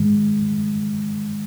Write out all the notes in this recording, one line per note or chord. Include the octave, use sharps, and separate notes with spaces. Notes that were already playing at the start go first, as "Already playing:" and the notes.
Already playing: G#2 D#3 G#3